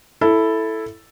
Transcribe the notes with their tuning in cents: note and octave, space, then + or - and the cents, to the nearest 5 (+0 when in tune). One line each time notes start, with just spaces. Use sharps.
E4 +0 A4 +0